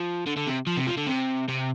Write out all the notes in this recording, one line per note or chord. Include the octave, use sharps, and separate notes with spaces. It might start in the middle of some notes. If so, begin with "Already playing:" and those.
Already playing: F3
D3
D3
C3
F3
C3
F3
D3
C3
C3